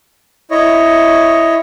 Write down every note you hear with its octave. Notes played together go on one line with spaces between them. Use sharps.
E4 C#5 D#5